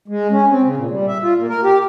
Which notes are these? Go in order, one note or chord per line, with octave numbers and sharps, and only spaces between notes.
G#3
C#4
C4
C#3
A#2
G3
E5
F4
A#2
A#4
G4